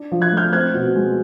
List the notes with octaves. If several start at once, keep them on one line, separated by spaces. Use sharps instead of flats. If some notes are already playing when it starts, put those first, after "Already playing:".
Already playing: D4
F3
F#6 G#6
A3
F6 G6
C4 F#6 G#6
B2
G#3